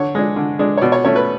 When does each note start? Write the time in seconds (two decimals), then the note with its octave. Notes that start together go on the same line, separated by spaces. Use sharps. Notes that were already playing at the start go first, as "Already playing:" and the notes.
Already playing: D3 C#5
0.15 G#3 D4
0.36 D3
0.59 G#3 D4
0.78 C#5
0.82 B2 D5
0.92 C#5
1.05 A3 C#4 C#5
1.16 B4